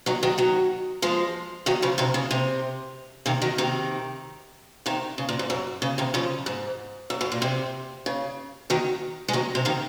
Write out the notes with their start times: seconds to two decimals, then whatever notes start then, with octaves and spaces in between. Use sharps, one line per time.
0.06 D#3 F#3
0.23 D#3 F#3
0.38 D#3 F#3
1.02 F3 G#3
1.66 D#3 F#3
1.82 C#3 F3
1.98 C3 D#3
2.14 C#3
2.31 C3
3.26 C3 D#3
3.42 D#3 F#3
3.58 C3 D#3
4.86 C3 D#3
5.18 C#3
5.29 A#2
5.39 G#2
5.50 F#2
5.82 C#3
5.98 C3 D#3
6.14 C#3 F3
6.46 G#2
7.10 F#2
7.21 F#2
7.32 A#2
7.42 C3
8.06 C#3
8.70 D#3 F#3
9.28 G#3
9.33 D#3 F#3
9.55 C3
9.65 C3 D#3